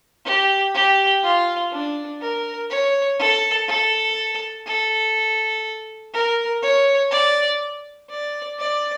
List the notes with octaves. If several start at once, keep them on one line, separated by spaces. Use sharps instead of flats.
G4
G4
F4
D4
A#4
C#5
A4
A4
A4
A#4
C#5
D5
D5
D5